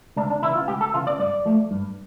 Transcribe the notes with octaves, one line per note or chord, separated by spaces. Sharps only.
C#2 D4
D4
C#3 E3 E4
F4
C#2 G4
A4
C#3 E3 F4
D5
G2 D5
F3 A3
G2